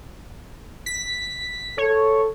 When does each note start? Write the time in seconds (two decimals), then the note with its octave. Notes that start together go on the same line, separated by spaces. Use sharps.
0.86 B6
1.78 A4 C#5